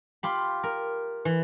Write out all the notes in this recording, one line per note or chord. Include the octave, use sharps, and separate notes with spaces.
F4 G4 B5
A#4
E3